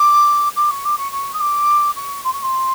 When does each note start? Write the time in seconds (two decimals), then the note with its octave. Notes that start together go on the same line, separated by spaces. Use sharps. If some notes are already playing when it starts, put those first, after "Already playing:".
Already playing: D6
0.56 D6
0.70 C#6
0.84 D6
0.97 C#6
1.11 C#6
1.33 D#6
1.40 D6
1.95 C#6
2.24 C6
2.32 C#6
2.42 C6